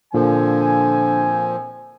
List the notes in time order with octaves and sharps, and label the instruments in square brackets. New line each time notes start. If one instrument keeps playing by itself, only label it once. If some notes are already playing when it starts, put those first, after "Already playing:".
[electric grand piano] A#2 [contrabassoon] D3 [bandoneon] F3 [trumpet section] C4 G#5